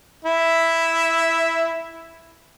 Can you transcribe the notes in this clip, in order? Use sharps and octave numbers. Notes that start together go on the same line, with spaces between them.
E4 E5